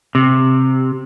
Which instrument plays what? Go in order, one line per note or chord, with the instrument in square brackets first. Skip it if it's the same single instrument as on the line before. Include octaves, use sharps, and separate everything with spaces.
[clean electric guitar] C3